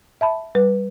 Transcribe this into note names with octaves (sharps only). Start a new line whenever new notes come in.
E5 A5 B5
G3 B4